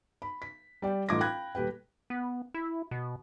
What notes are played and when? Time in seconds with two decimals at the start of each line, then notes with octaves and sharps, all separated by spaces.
0.22 B5
0.42 B6
0.82 G3 D5 G5
1.09 A1 D#4 F4 D6 G#6 A#6
1.20 F5 G5 B5 F#6 G#6 A#6
1.55 D#1 G4 B4 G5
2.10 B3
2.54 E4
2.91 B2